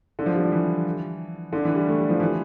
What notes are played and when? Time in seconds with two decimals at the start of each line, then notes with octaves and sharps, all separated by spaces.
0.19 D3
0.26 F3
0.36 G3
0.44 F3
0.52 E3
1.53 D3
1.65 E3
1.75 G3
1.87 A3
1.98 G3
2.10 F3
2.20 E3